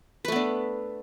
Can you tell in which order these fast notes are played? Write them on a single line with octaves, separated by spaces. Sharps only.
B4 A3 B3 D4